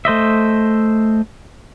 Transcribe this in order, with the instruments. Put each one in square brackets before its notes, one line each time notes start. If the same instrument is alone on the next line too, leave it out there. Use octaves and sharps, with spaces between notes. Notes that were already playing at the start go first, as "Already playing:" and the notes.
[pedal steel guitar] A3 C5 D#5 E5